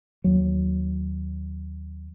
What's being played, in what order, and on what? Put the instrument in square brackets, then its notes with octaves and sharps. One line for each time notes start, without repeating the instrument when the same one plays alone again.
[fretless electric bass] D#2 F#3